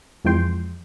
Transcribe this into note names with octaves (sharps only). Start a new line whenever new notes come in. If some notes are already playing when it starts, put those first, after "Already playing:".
F2 E3 F3 G#3 G5 C6